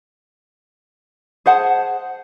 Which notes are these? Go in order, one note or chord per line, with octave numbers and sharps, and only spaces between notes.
G#4 C5 F#5 A5